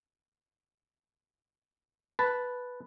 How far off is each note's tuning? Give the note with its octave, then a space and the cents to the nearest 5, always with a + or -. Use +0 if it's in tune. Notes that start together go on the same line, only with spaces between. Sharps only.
B4 +0 A5 -5